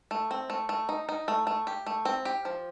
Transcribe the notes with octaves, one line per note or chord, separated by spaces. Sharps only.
A3
C4
A3
A3
D#4
D#4
A3
A3
G4
A3
C4
G4
F3